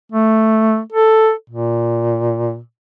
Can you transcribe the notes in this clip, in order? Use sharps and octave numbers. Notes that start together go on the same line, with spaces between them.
A3
A4
A#2